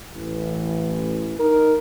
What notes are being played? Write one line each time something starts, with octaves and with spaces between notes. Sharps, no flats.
A1 E3
D#4 A#4